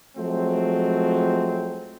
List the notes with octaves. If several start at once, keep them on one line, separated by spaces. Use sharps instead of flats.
F3 F#3 G#3 A3 C4